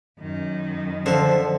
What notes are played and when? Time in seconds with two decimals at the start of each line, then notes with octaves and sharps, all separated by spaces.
0.20 F#2 D#3
1.06 D3 F3 C5 E5